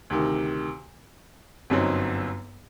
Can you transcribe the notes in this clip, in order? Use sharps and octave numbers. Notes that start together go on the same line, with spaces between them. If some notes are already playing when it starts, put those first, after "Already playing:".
D2 C3 D#3
G1 F#2 F#3 C4 D#4